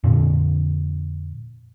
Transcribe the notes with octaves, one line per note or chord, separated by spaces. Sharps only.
F2 A#2 D3